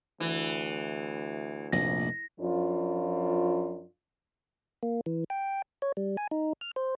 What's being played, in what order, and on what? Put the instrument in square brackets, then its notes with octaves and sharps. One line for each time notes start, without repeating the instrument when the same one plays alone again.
[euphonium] D2 [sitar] E3
[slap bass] F1 A#1 [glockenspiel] A#6
[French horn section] F#2 F3 D4 F4
[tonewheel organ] A#3
E3
G5
C#5
G3
G#5
D#4
F6
C5